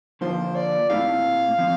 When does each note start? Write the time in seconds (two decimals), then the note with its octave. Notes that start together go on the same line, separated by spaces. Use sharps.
0.21 D3 F3 A#3 F4 C5
0.56 D5
0.90 A#2 A3 C4 E4 G4 F5
1.58 F3 C4